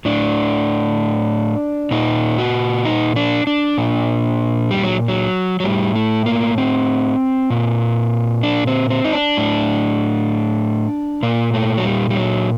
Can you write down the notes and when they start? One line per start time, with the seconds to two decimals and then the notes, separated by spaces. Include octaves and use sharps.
0.05 A2 D4
1.91 A#2 D#4
2.38 F#4
2.85 D#4
3.16 D4
3.47 D4
3.78 A#2
4.71 G3
4.84 F#3
5.08 F#3
5.60 F#3
5.64 A2 G3
5.96 A3
6.26 A#3
6.58 C4
7.50 A#2
8.43 D4
8.67 C4
8.90 C4
9.04 D#4
9.13 D4
9.37 A2
11.23 A#2 A#3
11.54 A3
11.78 F#3
11.85 G3
12.10 G3
12.16 F#3